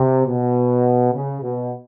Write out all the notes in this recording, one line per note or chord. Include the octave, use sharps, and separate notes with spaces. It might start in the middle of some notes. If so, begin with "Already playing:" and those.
Already playing: C3
B2
C#3
B2